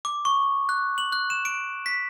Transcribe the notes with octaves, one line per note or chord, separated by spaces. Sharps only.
D6
C#6
F#6
F#7
F#6
E7
D7
B6